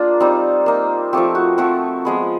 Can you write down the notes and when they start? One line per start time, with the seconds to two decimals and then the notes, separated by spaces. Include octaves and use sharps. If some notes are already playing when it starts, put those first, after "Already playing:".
Already playing: A#3 D4 F4 G#4
0.20 G3 C4 D#4
0.66 A#3 D#4
1.13 F3 A3 C4 G4
1.35 F#4
1.58 F3 A3 C4 F#4
2.05 F3 G#3 B3